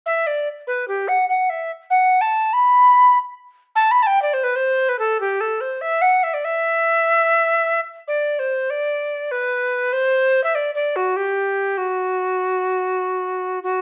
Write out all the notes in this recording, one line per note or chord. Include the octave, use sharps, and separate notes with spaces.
E5
D5
B4
G4
F#5
F#5
E5
F#5
A5
B5
A5
B5
A5
G5
D5
C5
B4
C5
B4
A4
G4
A4
C5
E5
F#5
E5
D5
E5
D5
C5
D5
B4
C5
E5
D5
D5
F#4
G4
F#4
F#4